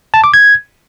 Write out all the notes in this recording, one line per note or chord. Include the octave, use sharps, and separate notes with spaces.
A5
D6
G#6